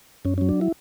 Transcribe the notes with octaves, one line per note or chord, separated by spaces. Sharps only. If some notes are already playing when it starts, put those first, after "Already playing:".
F#2 C#4
F#3 C#4
D4
E4